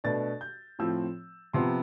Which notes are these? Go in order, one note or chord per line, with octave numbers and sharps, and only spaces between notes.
B2 A3 D4 A6
G6
A2 F3 C4 E6
C3 F3 B3 C6